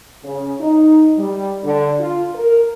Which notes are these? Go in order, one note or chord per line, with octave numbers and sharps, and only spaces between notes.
C#3
D#4
G3
D3
F4
A#4